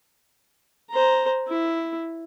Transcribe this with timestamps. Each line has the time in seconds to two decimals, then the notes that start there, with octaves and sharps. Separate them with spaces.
0.91 C5 A#5
1.48 E4